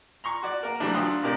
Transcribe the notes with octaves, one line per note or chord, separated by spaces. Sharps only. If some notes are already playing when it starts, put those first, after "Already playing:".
A#5 C6 C#6
F#4 D5
A#3 A#4
E3 F#3 G3 A3 D4
D2 F#3 D4 F4 C6 D#6
A2 C3 G4 A#4 D5